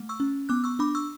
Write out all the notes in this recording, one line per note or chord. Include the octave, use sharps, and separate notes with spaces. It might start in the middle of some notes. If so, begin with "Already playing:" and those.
Already playing: A3
C#6 E6
C#4
B3 D6 F#6
C#6 E6
D4 B5 D6
C#6 E6